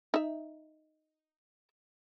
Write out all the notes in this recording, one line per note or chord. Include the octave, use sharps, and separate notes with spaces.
D#4 E5